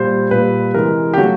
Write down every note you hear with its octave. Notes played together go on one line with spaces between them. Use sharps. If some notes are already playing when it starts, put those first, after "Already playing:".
Already playing: A#2 G3 C5
A#2 G3 B4
C3 E3 G#3 A#4
G4
C#3 F#3 A3 F#4